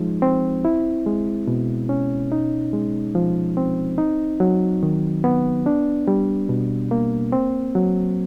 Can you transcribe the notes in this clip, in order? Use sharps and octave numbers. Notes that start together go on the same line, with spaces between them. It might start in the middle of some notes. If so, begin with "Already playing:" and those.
Already playing: F3 G#3 D#4
C4
E4
G#3
B2
C#4
D#4
G#3
F3
C4
D#4
F#3
D#3
B3
D4
G3
B2
A#3
C4
F#3